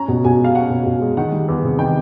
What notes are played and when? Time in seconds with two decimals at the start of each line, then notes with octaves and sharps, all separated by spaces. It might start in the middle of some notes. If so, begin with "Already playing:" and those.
Already playing: C#4 A#5
0.08 B2
0.25 B2 G#5
0.39 G#3
0.44 F5
0.55 C#4 F#5
0.70 B2
0.86 B2
1.01 G#3
1.17 D#3 F#5
1.32 G3
1.48 E2
1.64 C3
1.79 D#3 G5